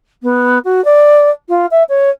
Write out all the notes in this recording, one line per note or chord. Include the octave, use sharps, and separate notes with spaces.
B3
F#4
D5
F4
E5
C#5